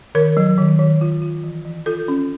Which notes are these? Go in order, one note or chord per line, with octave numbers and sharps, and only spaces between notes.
D#3 A#4
F#3
D#3
D#3
F4
F4
E3
E3
F4 A4
C#4